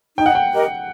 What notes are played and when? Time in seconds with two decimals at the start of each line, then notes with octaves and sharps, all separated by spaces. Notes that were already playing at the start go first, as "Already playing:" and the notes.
0.18 D#4 G5
0.26 F#5
0.35 G5
0.52 G4 A#4 D#5